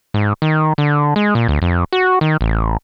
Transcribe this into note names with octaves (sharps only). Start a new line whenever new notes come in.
G#2
D#3
D3
G#3
A#2
D2
F2
F#4
D#3
A1